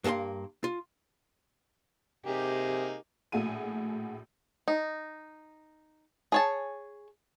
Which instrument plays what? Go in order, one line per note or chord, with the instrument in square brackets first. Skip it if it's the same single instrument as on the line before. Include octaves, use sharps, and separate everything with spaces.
[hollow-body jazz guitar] G2 A#3 A4 F5 C6
F4
[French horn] C3 [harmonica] A#3 D#4 G#4 [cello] G4
[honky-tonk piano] A#1 A2 A3 F#4 G#4 D#7
[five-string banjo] D#4
G#4 C#5 A5